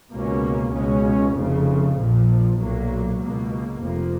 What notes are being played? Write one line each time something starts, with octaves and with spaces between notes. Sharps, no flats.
C#2 B2 A#3 C#4
C#2 B2 G#3 C#4
F1 F2 C#3 F3
A#1 A#2 F3
B1 A#2 F#3 A#3
C#2 B2 A#3
F1 F2 F3 A#3